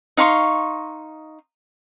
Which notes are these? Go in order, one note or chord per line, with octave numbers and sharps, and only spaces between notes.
D#4 F5 C6 C#6